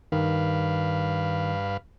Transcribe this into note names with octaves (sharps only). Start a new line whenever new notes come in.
G2 D#3 B4 F5